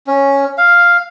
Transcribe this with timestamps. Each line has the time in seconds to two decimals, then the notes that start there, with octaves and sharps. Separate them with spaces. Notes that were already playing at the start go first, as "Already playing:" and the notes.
0.07 C#4
0.58 F5